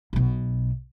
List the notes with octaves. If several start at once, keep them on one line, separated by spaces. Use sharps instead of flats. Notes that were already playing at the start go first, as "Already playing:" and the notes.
B1 B2